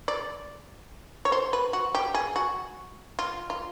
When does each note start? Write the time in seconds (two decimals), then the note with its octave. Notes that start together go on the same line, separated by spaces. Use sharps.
0.08 D5
1.25 C#5
1.32 C5
1.53 B4
1.73 F#4
1.95 G4
2.14 G#4
2.36 F#4
3.19 F4
3.50 F4